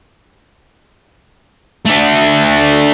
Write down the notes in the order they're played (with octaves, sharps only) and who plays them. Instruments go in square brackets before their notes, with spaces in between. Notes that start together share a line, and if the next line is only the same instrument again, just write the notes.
[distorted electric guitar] A3 D4